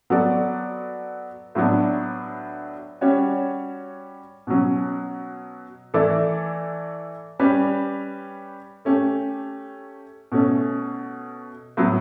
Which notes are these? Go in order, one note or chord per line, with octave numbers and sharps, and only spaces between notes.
F#3 B3 F#4 A4 D5
A2 F#3 B3 D4
G3 C#4 F#4 C#5
B2 F#3 C#4
E3 A3 E4 A4 D5
G3 C#4 G4 B4
A3 C#4 G4
B2 A3 C#4
A2 F#3 B3